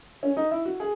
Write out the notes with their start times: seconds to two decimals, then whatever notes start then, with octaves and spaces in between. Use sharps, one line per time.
0.23 C#4
0.37 D#4
0.51 E4
0.65 F#4
0.80 G#4